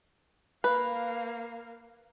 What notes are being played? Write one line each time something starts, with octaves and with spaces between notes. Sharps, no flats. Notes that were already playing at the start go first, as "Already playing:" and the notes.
A#3 B4 F5